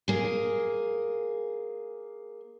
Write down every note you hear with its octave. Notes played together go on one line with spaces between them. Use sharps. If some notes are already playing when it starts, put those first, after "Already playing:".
A#3 G#4